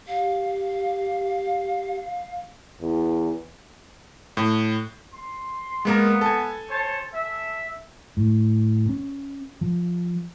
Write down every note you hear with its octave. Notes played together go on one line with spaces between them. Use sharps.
G4 F5
E2
A2
C6
G#3 A#3 B3 A#4
A4 G#5
C5 C#5 A5
E5
A2
C#4
F3